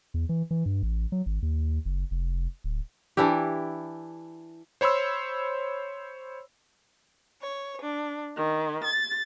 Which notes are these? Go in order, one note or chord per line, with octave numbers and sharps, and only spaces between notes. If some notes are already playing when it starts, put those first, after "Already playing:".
E2
E3
E3
G2
A1
F#3
G#1
D#2
F#1
F1
D1
E3 D4 E4 G4
C5 C#5 B5 C6 E6
C#5
D4
D#3
A6